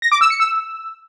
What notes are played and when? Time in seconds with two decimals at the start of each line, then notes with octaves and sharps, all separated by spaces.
0.02 A#6
0.12 D6
0.21 E6
0.30 C#7
0.40 E6